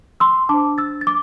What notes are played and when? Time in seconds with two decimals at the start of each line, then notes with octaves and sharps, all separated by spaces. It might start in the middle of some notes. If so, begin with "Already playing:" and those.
0.20 C6 E6
0.49 D4 C5 A5 D6
0.78 E6 A6
1.01 A6
1.07 D6